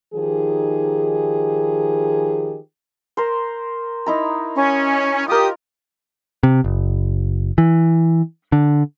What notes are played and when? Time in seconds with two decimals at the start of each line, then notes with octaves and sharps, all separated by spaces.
0.14 D#3 F3 D#4 G4 G#4
3.17 A#4 C5
4.06 D#4 E4 A#5
4.55 C#4
5.28 F4 G4 A#4 D#6
6.43 C3
6.64 F#1
7.58 E3
8.52 D3